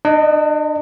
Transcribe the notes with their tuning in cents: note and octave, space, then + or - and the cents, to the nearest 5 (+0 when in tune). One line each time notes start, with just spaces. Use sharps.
D4 +40 D#5 +0